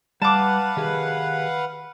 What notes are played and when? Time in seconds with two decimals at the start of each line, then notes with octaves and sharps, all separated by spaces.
0.22 G3 B4 F5 F#5 A5 D6
0.77 D#3 G4 G#4